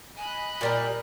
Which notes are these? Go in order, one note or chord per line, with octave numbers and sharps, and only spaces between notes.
D#5 G#5 B5 F#6
A#2 G3 A#4 A#5